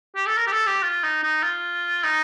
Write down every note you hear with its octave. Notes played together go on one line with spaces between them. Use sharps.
G4
A4
A#4
G4
A4
G4
F4
D#4
D#4
F4
D#4